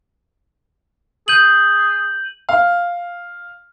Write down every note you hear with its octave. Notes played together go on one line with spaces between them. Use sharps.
G#4 G6 D#7 F#7
F5